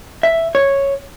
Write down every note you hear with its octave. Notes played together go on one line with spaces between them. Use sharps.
E5
C#5